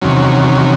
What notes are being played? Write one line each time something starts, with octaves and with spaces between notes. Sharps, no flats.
E2 C3 D#3 F#3 C#4